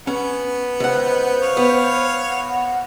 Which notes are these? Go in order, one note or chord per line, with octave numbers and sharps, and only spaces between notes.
B3 C#4
C#2 C5 F#5
C#5 F5
B3
F#5